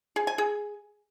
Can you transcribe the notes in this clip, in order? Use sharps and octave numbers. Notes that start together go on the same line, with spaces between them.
G#4
G#5
G#4